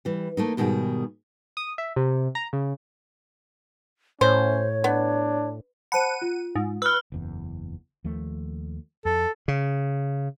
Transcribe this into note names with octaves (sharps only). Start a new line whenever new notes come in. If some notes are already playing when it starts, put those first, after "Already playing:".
E3 G3
A3 A#3 D#4
G#2 B2 D#3 G3 G#4
D#6
E5
C3
A#5
C#3
A2 C#4 C5 C#5
B3 D4
C5 F#5 A5 B5 D#7
F4
G#2
B4 E6 F6
F#1 E2
D#2 F3 A3
F2 A4
C#3